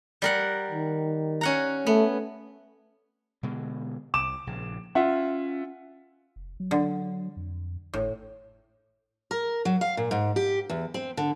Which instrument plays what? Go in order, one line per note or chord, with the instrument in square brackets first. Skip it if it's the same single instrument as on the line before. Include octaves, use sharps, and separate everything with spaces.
[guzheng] G3 A#4 F#5
[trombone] D#3
[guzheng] C#4 F#5 A#5
[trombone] A3 [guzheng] B3
[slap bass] B2 D3 G#3
[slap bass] C2 [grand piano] D6 E7
[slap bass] A#1 C#3
[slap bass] C#4 [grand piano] F4 E5 F#5
[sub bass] F1
F#3
[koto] D3
[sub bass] F2
[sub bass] G#1 [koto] A2
[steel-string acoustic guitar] A#4
F#3
F5
A#2
G#2
G4
E2
C4
D3